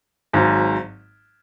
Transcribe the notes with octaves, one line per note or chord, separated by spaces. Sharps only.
G#1 G#2 F#3